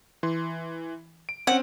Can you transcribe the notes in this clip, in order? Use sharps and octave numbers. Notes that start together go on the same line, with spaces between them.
E3 C6
D7
C4 C#4 F#5